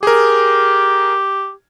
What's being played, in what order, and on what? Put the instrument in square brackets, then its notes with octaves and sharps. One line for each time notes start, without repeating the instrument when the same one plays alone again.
[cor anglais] G4 [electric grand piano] G#4 A#4